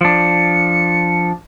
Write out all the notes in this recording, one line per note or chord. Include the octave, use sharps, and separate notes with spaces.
F3 D4 C#7